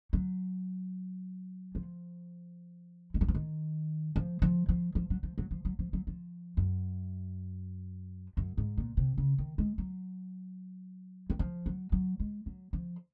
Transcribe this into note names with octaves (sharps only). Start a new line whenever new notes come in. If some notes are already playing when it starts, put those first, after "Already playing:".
F#3
F3
G#3
F#3
F3
D#3
F3
F3
F3
F3
F#3
F3
F#3
F3
F#3
F3
F#3
F3
F#2
F#2
G#2
A#2
C3
C#3
D#3
G#3
F#3
D#3
F3
F#3
F#3
G#3
F#3
F3